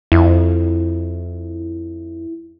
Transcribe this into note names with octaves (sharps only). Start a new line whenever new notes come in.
F2 E4